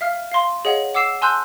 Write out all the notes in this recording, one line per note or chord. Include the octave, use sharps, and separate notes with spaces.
E5 F5 F6
F5 C6
G#4 C#5 D#5 F5 F#5
F#5 D6 E6 C7 E7
G#5 A5 C6 E6 F#6 G6